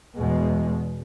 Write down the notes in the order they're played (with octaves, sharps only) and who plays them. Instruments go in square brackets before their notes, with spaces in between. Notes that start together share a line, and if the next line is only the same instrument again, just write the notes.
[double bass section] E2 B2 G#3